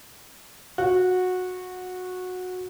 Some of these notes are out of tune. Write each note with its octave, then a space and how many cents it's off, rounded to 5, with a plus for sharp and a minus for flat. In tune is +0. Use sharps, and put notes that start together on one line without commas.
F#4 -15